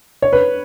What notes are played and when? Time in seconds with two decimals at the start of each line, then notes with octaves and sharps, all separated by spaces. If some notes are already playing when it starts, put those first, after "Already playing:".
0.22 C#5
0.33 B4